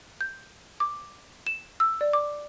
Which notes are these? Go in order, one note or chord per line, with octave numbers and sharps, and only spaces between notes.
G6
D6
E7
E6
D5
D6